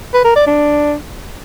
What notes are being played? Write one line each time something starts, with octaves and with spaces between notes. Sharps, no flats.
B4
A#4
D5
D4